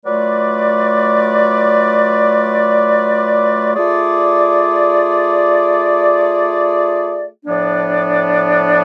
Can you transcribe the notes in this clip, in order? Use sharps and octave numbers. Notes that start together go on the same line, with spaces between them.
F#3 A3 F4 B4 D5
A3 F4 G#4 D5
A2 F3 B3 D4